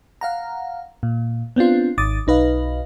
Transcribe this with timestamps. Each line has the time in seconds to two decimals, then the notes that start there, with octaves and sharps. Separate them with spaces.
0.21 F5 F#5 A#5
1.03 A#2
1.56 B3 C4 D4 F4
1.98 G#1 D6 D#6 A6
2.27 B1 D#4 B4 D#5 F5